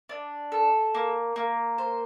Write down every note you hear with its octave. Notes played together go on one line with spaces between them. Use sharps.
D4
A4
A#3
A#3
C5